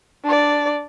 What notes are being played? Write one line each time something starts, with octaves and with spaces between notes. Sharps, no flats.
D4 D5